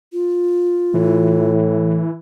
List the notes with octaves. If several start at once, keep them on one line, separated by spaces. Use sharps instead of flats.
F4
A2 E3